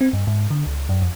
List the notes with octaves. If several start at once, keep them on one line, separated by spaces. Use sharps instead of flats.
C4
G2
G#2
D3
C#2
F#2
F2